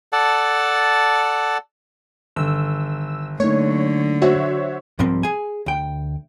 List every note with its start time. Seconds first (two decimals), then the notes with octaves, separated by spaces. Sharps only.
0.13 A4 D5 F#5 A5
2.36 G1 D3 D#3 E6
3.40 D3 F#3 A3 A#3 D#4 C#5
4.22 F#4 C5 C#5 E5
4.99 C2 G#2 F3 G3 A#3 C4
5.23 G#4 G#5
5.66 D2 G5